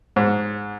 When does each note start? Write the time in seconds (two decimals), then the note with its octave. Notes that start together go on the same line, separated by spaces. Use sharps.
0.16 G#2